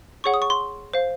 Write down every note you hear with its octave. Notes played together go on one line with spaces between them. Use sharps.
G#4 C#5 F#5 C#6
D#6
C#6
C6
C5 F5